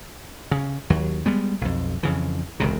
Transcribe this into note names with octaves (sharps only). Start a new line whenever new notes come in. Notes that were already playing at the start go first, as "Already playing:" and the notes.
C#3
D#2 F#3
G3 G#3 B3
B1 F2
F2 C#3 E3
E1 C#2 C3